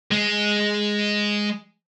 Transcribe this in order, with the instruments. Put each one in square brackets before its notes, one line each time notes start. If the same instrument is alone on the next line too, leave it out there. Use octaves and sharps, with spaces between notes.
[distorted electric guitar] G#3